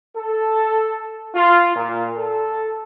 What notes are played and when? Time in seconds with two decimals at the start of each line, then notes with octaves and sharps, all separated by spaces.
0.15 A4
1.34 F4
1.76 A#2
2.16 A4